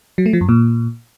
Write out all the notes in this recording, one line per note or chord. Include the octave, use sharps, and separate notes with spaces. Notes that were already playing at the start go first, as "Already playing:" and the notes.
F#3
A3
F3
F#2
A#2